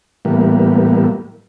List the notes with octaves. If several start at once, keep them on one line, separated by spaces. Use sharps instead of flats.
A2 E3 G3 A#3 B3